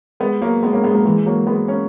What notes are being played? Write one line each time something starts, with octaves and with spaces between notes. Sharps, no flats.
G#3 B3
F#3 A#3
G#3 B3
A#3 C#4
G#3 B3
F#3 A#3
E3 G#3
F#3 A#3
G#3 B3
A#3 C#4